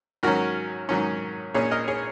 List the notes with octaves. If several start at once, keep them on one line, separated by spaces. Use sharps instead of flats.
G#2 D#3 F#3 C#4 F#4 A#4
G#2 D#3 F#3 C#4
A#1 A#2 A#3 C#4 G#4 C#5
A#4 D#5
G#4 C#5